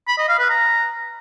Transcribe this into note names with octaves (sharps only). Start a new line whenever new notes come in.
B5
D#5
F5
B4
A#5